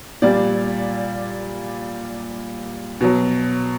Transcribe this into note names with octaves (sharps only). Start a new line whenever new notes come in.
A#2 G3 D5
B2 F#3